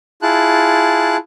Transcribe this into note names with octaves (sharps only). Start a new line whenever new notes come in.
E4 F4 G#4 A5 F#6